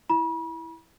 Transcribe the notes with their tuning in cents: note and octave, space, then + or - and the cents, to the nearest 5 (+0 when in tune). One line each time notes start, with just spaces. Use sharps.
E4 +0 B5 -40